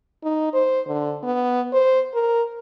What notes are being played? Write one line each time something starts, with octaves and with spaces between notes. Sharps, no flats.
D#4
C5
D3
B3
C5
A#4